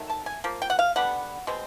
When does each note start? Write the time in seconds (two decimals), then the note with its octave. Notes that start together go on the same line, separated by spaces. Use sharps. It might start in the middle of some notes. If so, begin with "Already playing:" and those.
Already playing: D#3 F#3 A3
0.10 A5
0.26 G#5
0.44 F3 A#3
0.62 G5
0.70 F#5
0.79 F5
0.96 D3 G3 B3 F#5
1.47 B2 G#3 C4